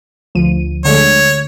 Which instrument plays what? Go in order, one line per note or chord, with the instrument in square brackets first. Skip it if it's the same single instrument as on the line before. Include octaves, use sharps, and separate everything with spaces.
[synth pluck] D2 F3 D#7
[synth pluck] D3 G#3 A3 [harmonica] C#5